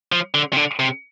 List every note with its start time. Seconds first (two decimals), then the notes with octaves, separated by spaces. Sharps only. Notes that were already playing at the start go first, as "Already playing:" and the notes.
0.12 F3
0.34 D3
0.53 C3
0.57 D3
0.79 C3